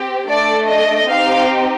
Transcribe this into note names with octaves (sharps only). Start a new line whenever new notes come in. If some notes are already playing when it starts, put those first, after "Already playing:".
Already playing: C4 G4
A3 D4 A4 D5
D#5
C4 D#4 G4 F5